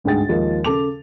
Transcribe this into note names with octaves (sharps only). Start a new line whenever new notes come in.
G1 D2 G#2 G#4 G5 A6
D#2 F3 G#3 D#4
C#3 A4 A5 D6 F7